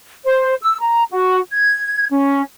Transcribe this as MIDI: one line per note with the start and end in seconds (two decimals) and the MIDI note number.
0.24 0.54 72
0.62 0.78 88
0.80 1.03 82
1.11 1.38 66
1.52 2.06 92
2.11 2.41 61